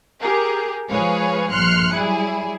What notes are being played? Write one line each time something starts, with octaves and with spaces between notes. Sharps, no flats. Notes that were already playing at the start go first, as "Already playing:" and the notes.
G4 G#4 A#4
F3 G#3 G#4 B4 C#5 F5
A#1 G2 C6 F6 F#6 C#7
F#3 G3 E4 G#4